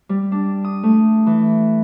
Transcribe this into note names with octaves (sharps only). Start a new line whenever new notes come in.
G3
D4
D#6
A3
E3